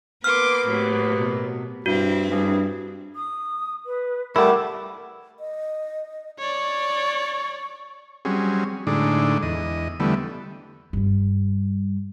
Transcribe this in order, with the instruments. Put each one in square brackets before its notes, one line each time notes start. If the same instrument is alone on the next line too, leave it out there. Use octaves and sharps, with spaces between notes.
[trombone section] A#3 B3 [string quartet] B4 C6 D6 [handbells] F6
[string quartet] A2 C3 F#3
[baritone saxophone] B2
[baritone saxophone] G2 [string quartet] C4 E4 [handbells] F#4
[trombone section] A1 G3 G#4 [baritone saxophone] G2
[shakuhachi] D#6
B4
[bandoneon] G3 A3 [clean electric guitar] E4 F#5 [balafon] A#4 [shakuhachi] D6
[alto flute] D#5
[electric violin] C#5 D5 [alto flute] C#6
[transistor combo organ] F#3 G3 C4 C#4 G#4
A2 D3 G#3 D4 D#4
E2 D#5
D3 E3 G3 A3 B3
[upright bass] G2 G3